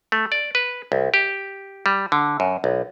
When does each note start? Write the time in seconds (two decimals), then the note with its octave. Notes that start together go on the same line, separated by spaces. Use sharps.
0.12 A3
0.32 D5
0.55 B4
0.92 C2
1.14 G4
1.86 G3
2.12 D3
2.40 F#2
2.64 B1